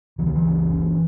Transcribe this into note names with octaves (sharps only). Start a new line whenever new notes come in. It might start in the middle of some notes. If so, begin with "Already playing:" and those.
C#2 E3
D#3
E3
C#2
F#1